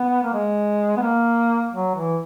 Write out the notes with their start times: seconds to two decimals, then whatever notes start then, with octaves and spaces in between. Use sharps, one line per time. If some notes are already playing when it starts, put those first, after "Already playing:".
Already playing: B3
0.24 A#3
0.33 G#3
0.97 B3
1.02 A#3
1.73 F#3
1.95 E3